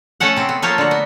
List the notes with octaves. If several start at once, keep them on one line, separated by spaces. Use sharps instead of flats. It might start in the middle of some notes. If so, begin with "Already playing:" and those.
A3 C#4 A4 F#5
C3 C4
B3
F3 A3 A#3 F4 C#5
D3 F#4
B3